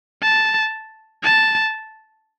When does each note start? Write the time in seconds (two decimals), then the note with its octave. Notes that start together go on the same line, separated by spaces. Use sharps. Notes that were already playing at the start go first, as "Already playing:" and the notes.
0.22 A5
1.24 A5